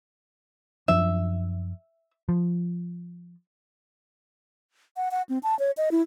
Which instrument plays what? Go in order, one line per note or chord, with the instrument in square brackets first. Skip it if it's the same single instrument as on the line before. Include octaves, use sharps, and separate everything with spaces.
[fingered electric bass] F#2 F3 D4 [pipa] E5
[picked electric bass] F3
[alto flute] F#5
F#5
C4
A5
C#5
D#5
E4